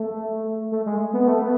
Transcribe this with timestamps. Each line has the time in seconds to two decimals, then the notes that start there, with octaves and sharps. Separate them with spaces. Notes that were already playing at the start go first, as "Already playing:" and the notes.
Already playing: A3
0.72 A3
0.86 G#3
1.13 B3
1.28 A3
1.42 B3